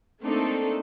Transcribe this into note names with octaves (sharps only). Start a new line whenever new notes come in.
A3 A#3 C4 D4 D#4 A4